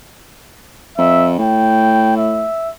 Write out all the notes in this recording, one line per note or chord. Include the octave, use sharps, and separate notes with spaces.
F2 E5
A2 G5
E5